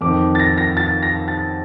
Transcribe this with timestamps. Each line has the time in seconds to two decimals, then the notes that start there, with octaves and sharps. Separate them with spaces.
0.01 F2 D#3 D6
0.35 A6
0.39 A#6
0.58 A#6
0.77 A6
1.03 A#6
1.28 A6